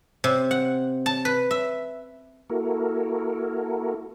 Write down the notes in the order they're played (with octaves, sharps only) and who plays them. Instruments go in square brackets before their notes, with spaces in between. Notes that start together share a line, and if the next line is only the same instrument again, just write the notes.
[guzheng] C3
F#5
A5
B4
E5
[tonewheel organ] A#3 E4 F#4 A4 A#4